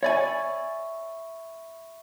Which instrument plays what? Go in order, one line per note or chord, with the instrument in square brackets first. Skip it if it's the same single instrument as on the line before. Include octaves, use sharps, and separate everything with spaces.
[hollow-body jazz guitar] C#5 D5 G#5 [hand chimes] E5 B5 C#6